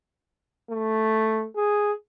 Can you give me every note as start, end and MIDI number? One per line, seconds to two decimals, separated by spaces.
0.71 1.46 57
1.56 1.92 68